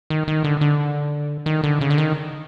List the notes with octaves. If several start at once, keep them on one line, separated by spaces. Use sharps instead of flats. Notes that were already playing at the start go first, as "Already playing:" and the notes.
D#3
D#3
D3
D3
D#3
D3
C#3
D3
D#3